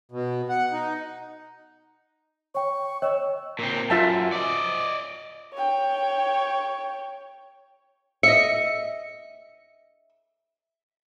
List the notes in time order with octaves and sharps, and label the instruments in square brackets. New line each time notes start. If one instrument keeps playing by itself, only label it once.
[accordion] B2
F#5
D#4
[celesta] C#5 G5 [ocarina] C#6
[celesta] C#5 D#5 G5 [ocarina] E6
[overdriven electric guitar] A#2 C4
[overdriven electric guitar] F#2 [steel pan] F4 E5 A5
[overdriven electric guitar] D5 D#5
[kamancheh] C#5 G5
[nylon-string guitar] D#5 E5 [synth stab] C#7